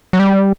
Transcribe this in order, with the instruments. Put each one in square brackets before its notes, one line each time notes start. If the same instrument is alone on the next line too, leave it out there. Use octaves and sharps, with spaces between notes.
[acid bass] F#3
G3